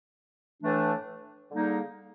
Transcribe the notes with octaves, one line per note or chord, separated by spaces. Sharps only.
A2 E3 A3 D4
D3 G3 A#3 D#4 G#4